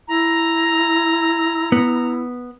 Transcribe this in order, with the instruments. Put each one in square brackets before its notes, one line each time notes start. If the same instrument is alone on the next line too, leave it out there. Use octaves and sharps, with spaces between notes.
[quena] E4 [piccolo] A#5
[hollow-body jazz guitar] B3